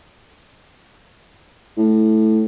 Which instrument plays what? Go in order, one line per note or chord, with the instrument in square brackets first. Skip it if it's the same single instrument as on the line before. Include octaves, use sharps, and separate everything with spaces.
[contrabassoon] A2